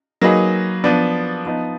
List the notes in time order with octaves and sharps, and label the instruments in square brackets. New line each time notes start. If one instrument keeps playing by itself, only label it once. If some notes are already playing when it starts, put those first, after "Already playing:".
[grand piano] F#3 A#3 D#4 G#4 B4
F3 B3 D4
F3 B3 D#4